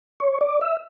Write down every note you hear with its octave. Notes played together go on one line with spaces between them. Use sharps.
C#5
D5
E5